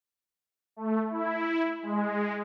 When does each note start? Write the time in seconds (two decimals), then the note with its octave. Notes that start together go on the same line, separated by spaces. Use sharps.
0.76 A3
1.10 E4
1.83 G#3